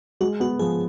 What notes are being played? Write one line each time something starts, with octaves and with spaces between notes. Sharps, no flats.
G#3 F#4
B3 F#4
F3 G#4